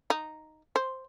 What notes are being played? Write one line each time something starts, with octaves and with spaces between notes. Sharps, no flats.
D#4
C5